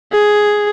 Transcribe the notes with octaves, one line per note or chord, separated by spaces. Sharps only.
G#4